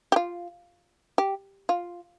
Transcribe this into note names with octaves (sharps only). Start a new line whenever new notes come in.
G4
F4
G4
F4